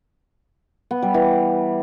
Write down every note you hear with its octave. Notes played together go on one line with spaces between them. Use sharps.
B3
G3
E3